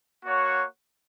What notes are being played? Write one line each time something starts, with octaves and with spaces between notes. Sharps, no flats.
A#3 F#4 C#5 F#5